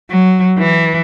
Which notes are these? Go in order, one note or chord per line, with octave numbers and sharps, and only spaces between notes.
F#3
E3